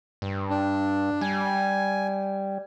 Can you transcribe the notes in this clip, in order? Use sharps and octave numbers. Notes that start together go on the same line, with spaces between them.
G2
D4
G3 G#5